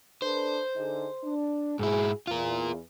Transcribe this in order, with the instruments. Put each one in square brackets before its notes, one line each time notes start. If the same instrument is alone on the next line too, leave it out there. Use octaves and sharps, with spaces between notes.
[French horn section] D4 A4 B4 [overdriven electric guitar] C5
[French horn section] D3 D#4 G#4
D4
[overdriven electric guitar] G#2 E4 [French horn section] F#4 G#4
[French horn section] E2 [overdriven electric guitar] F4 A#4